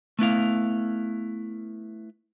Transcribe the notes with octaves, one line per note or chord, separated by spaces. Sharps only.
A3 B3 E4 F5